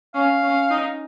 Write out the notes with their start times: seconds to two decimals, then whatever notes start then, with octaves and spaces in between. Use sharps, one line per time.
0.14 C#4 F5
0.43 C#4
0.70 D#4